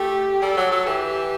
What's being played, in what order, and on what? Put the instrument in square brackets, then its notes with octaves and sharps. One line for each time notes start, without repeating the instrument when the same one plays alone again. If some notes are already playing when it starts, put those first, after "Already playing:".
Already playing: [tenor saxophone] A3 [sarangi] G4
[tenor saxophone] G3 [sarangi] A4
[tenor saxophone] F#3
F#3
[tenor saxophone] E3 [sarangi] G4